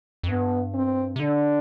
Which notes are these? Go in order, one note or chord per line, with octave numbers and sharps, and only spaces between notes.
F2
G2 B3
C4
C3
D3 D4